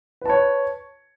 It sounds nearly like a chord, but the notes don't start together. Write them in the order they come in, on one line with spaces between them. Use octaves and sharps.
B4 A5 C#5